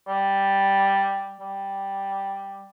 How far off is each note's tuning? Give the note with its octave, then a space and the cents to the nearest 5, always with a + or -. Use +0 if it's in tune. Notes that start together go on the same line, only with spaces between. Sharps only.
G3 +0
G3 +0